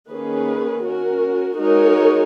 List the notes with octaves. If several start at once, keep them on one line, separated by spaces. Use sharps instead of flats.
D#3 A#3 C#4 G#4 B4
C#4 F#4 A#4
G#3 D#4 F#4 A#4 C#5